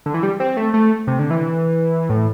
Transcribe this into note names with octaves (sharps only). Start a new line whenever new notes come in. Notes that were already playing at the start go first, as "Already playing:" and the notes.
D3
E3
G3
C4
A3
A3
C3
D3
E3
A2